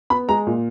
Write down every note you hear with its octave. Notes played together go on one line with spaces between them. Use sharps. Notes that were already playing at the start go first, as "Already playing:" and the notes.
B3 B5
G#3 A#5
A#2